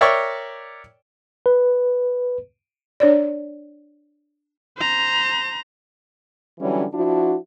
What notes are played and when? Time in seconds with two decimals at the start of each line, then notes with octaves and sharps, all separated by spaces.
0.01 A#4 C#5 D5 E5 G5 C#6
1.46 B4
3.00 D4 C#5 D5
4.78 C5 A#5
6.60 D3 E3 F#3 G3 C#4
6.94 F3 D4 E4 F#4